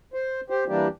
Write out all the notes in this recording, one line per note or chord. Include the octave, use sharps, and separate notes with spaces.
C5
G4 C5
E3 G3 A#3 D4 G4